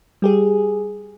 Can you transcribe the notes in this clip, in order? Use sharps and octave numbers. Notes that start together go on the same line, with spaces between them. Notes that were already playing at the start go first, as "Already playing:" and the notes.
G3 G4 G#4